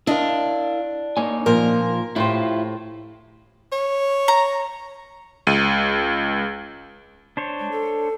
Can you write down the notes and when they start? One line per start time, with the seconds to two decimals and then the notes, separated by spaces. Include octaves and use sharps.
0.07 D4 E4 A#4 D#5 F5
1.17 A#3 D#4 C#5 G#5
1.46 A#2 F3 A#4
2.16 A2 E4 F4 G4 C5
3.72 C#5
4.28 A#5
5.47 C#2 D#7
7.37 D4 C5 C#5
7.59 G#3
7.71 A4